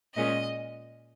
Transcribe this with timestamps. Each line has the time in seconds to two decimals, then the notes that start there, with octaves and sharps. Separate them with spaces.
0.16 A#2 G#3 C#4 D#5